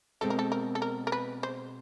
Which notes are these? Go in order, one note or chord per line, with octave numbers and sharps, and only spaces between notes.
B2 G#3 C4 A4
A#4
A4
A#4
A4
A#4
A#4
B4
C5